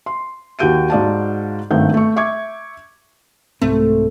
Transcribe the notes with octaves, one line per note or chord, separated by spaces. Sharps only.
C6
D#2 F#4 G4 G6 D7 D#7
G#2 F#4 D5 F5 F#5 A5
G#1 G2 D#3 A3 F#5 G6
A3 C#6
E5 C#6 D6 G#6
C2 G#2 A3 C4